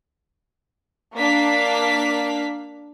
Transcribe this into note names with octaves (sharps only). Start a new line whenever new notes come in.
A#3 D4 F5 B6